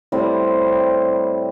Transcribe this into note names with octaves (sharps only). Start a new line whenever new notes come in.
A2 G3 C4 G4